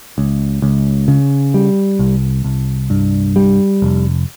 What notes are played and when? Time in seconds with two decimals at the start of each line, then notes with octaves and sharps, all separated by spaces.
0.18 C#2
0.62 C#2
1.08 C#3
1.54 G3
1.99 C2
2.44 C2
2.90 G2
3.36 G3
3.82 F1